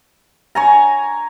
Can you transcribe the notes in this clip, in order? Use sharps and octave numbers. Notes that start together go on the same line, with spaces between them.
C#5 G#5 A#5